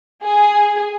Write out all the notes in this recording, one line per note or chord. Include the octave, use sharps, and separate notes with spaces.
G#4